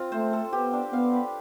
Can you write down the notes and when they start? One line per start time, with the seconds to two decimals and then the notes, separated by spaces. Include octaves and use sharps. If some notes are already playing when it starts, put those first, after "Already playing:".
Already playing: C4 F4
0.12 A3 C5
0.33 A4
0.52 B3 G4
0.73 D4
0.92 B3 F5
1.13 B4